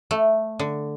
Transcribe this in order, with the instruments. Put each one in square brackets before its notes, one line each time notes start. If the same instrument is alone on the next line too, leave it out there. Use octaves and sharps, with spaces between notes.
[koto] A3
D3